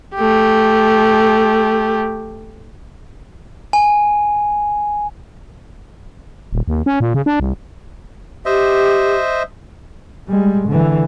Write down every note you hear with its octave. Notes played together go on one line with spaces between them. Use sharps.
A3 G4
G#5
D#1
D#2
C#4
A#2
C#3
D4
C2
G4 C5 D#5 E5
G3 G#3
D3 E3